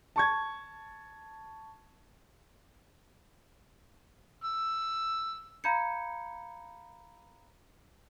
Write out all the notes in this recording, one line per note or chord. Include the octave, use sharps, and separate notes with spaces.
A5 C#6 G#6
E6
F5 A#5 B5 G6 G#6 C#7